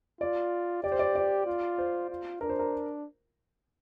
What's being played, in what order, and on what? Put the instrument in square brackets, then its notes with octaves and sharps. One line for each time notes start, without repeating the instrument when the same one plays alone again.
[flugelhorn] F4 [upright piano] D5
[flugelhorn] G4 [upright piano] D5
[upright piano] C5
D5
D5
[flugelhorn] F4
[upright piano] C5
[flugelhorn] F4
[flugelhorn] D4 [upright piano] A#4
[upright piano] C5
A#4